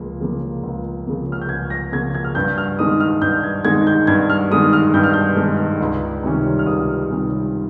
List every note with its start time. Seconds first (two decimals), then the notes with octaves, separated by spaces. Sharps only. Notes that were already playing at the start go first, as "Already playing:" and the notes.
Already playing: C#2 C#3 F3 A#3
0.21 C#3 F3 A#3
0.63 C#2
1.06 C#3 F3 A#3
1.32 F6
1.41 G6
1.49 C#2 G#6
1.70 A#6
1.92 C#3 F3 A#3 G#6
2.15 G#6
2.24 F6
2.35 G2 G6
2.58 F6
2.79 D#3 G#3 D#4 D#6
3.00 F6
3.21 G2 G6
3.43 G#6
3.65 D#3 G#3 D#4 G#6
3.87 G6
4.07 G2 G#6
4.30 F6
4.51 D#3 G#3 D#4 D#6
4.73 F6
4.94 G2 G6
5.04 F6
5.14 G6
5.37 D#3 G#3 D#4
5.80 C#2
6.23 C3 D#3 G3 C#4
6.59 F6
6.66 C#2 D#6
7.10 C3 D#3 G3 C#4